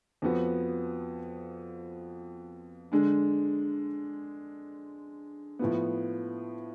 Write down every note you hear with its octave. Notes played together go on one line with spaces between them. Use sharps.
F2 F3 B3 F#4
D3 G#3 D4
A2 F3 B3